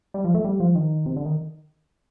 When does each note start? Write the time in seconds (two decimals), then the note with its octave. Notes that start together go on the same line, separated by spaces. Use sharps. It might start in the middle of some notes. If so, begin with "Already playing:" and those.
0.14 G3
0.24 F3
0.34 A3
0.44 G3
0.60 F3
0.75 D#3
1.06 C3
1.16 D3
1.26 D#3